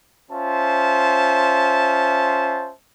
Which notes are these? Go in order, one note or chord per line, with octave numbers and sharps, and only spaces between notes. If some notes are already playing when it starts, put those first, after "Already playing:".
C#4 F4 C5 E5 A5